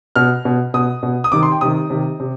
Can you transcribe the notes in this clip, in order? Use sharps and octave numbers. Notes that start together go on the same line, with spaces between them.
B2 F6
B2
B2 D#6
B2
D#6
C3 D#3 D6
C6
G5
C3 D#3 D#6
C3 D#3
C3